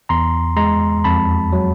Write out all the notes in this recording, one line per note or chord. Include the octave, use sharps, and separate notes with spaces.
E2 A#5 C6
G#3 A#5 C6
F2 A5 B5
F#3